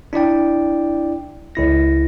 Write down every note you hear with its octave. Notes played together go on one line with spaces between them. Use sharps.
D4 E4 D5 G5
C#2 E4 A#6